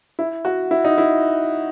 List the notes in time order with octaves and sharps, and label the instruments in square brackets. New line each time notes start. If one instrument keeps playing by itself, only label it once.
[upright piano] E4
F#4
E4
D#4
E4